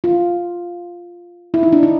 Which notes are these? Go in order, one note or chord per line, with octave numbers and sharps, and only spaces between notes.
F4
E4
D#4
D4
D#4